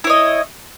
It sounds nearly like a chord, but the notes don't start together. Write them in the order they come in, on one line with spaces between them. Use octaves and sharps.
E4 C#5 D#5